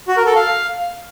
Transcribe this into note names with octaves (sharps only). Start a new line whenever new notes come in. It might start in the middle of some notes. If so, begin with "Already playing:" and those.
F#4
A#4
A4
F5